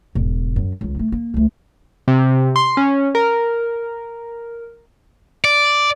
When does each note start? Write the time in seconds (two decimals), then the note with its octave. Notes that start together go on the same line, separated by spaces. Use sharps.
0.15 E1 G#2
0.56 F#2
0.81 C#2 D#3
0.96 A3 D#4
1.12 A#3
1.34 C#2 A3
2.08 C3
2.56 C6
2.77 C#4
3.15 A#4
5.45 D5